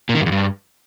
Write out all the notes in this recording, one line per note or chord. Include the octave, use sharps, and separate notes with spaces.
A#2
D#3
G2
E2
G2